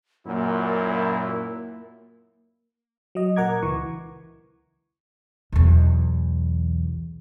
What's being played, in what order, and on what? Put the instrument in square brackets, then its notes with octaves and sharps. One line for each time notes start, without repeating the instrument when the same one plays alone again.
[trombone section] F#2 A#2 [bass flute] A#3 [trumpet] E4
[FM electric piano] F#3 D#5
A#2 A#4 F#5 A#5 D6 G#6
C#2 E3 C#6
[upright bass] B1 E2